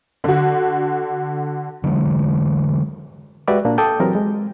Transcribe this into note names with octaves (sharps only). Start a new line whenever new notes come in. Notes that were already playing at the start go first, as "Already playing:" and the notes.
D3 F#4
D3 E3 F#3 G#3
G#3 F#4 G4 B4 D5 E5
A#2 A#3 D4
A4 G5 A5 D6 D#6 G6
E3 F#3 C4 F#4 G4 A#4
G#3